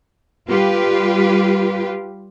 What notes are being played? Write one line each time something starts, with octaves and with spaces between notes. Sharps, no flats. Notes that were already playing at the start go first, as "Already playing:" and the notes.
G3 F4 G4 B4